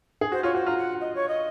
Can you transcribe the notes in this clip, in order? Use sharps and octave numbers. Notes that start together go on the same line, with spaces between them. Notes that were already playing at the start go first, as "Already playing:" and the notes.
G#4
F#4 C5
F4 C#5
F#4 C5
F4 A#5
F#5
D#5
C#5
D#5